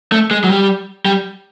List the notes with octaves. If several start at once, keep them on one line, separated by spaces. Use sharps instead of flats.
A3
G#3
F#3
G3
G3